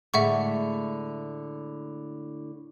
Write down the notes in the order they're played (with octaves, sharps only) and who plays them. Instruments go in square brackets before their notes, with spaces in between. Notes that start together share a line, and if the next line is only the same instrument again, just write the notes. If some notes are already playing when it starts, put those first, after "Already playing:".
[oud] A2 D3 G#3 [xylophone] E5 F#5 C#6